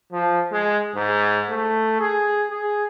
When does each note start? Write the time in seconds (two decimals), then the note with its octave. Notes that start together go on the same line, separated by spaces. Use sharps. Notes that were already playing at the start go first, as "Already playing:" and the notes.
0.12 F3
0.52 G#3
0.95 G#2
1.50 A3
2.00 G#4
2.50 G#4